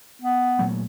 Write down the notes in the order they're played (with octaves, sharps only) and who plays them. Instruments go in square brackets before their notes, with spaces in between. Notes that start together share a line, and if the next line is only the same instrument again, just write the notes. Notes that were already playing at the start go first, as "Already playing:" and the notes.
[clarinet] B3
[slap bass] A#2 F#3 A3